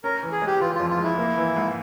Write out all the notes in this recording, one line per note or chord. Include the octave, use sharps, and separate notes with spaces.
C#4 A#4
E3
G#4
G#3 G4
E3 F4
F2 F4
F4
G#3 E4
A#3
E3
G#2